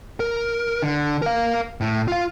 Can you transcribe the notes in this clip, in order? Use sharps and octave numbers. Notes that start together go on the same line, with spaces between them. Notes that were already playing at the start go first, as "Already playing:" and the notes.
A#4
D3
A#4 F5
A2
F4 F5